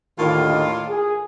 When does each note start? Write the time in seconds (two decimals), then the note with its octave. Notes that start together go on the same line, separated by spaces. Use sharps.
0.18 D#2 A2 D3 D#3 A#3 F4
0.89 G#4